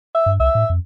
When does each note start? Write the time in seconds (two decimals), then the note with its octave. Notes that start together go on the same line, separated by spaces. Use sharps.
0.15 E5
0.26 G2
0.40 C2 E5
0.55 A2
0.70 F2